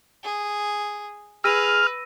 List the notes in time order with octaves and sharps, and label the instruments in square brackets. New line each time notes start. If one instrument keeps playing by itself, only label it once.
[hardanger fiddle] G#4
[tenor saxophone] G#4 [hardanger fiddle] B4 [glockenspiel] E6 A#6 D#7 [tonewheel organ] F6